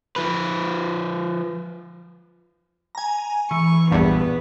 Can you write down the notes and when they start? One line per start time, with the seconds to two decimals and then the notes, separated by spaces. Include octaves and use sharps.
0.16 F3 B4
2.95 G#5 A#5
3.51 E3 C#6
3.91 A#1 E2 G2 B3